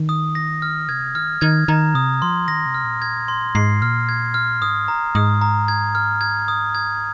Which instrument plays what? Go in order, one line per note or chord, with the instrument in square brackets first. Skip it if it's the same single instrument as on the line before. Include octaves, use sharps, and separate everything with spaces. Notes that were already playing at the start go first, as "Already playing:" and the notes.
Already playing: [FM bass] D#3
[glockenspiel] D#6
A#6
F6
[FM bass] C3 [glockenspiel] G#6
[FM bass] D#3 [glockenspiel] F6
[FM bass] D#3 [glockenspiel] G#6
[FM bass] D#3 [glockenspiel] A#5
[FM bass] C3 [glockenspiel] D#6
[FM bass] F3 [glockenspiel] C6
[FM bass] D#3 [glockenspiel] A#6
[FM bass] C3
[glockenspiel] F6
[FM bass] A#2
[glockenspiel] G#6
C6
[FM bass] G#2 [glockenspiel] C7
[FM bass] A#2 [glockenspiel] F6
[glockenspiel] G#6
F6
[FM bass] G#2 [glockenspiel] D#6
[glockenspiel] A#5
[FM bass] G#2 [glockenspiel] D#6
[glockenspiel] A#5
G#6
F6
G#6
D#6
G#6